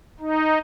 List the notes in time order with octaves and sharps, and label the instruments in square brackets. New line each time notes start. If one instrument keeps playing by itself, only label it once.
[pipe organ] D#4